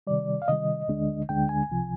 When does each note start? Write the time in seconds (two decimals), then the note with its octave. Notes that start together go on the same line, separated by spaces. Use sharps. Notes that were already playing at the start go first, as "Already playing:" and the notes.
0.07 C3 D#3 G3 D5
0.42 F5
0.48 C3 D#3 G3 D#5
0.88 D2 D3 G#3 D4
1.29 D2 D3 G#3 D4 G5
1.49 G#5
1.69 C2 C3 F3